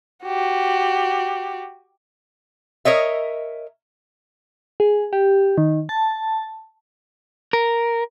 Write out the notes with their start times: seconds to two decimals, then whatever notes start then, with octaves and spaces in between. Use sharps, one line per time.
0.25 F#4 G4
2.85 A#4 C#5 D#5 E5
4.80 G#4
5.13 G4
5.58 D#3
5.89 A5
7.53 A#4